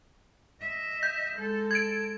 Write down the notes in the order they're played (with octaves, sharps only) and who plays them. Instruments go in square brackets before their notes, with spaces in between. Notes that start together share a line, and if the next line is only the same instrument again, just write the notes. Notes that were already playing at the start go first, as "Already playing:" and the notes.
[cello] D#5 E5
[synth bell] G6
[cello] G#3 A4
[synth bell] G#6 D7